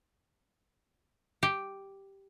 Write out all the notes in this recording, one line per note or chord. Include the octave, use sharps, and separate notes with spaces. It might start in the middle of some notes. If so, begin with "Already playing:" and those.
G4